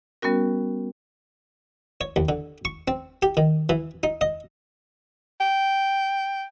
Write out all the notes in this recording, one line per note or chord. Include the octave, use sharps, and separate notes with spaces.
G3 B3 C#4 F#4 A#4
C#5
D#2
D3
C#6
C4
G4
D#3
E3
D#4
D#5
G5